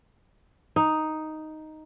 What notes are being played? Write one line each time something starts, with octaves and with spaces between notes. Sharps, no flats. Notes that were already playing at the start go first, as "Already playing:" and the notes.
D#4